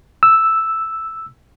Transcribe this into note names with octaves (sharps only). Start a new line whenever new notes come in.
E6